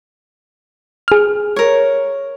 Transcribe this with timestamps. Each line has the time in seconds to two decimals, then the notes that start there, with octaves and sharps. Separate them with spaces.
1.08 G#4 F6
1.56 A#4 C#5